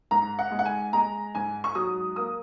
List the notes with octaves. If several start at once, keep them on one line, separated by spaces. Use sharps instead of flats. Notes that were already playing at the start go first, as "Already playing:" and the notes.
G#2 A#5
F#5
G#3
F#5
G#5
G#3 A#5
G#2 G#5
C#6
F#3 D#6
A#3 D#6